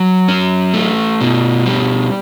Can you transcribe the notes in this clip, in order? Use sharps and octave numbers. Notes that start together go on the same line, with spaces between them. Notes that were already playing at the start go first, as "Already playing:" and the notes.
Already playing: F#3
C#4
A3
B2
G3